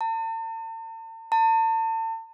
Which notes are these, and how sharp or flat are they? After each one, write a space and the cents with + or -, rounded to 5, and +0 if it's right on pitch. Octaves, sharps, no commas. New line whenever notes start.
A5 +45
A5 +40